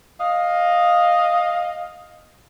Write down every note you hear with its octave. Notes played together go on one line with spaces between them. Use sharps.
D#5 F5